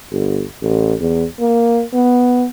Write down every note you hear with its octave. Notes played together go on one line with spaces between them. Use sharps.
G1
A1
E2
A#3
B3